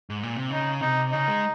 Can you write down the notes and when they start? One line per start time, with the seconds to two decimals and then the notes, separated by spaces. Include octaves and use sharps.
0.10 G#2
0.23 A#2
0.37 C3
0.50 C#3 D#4
0.81 C3 D#4
1.12 C#3 D#4
1.28 G#3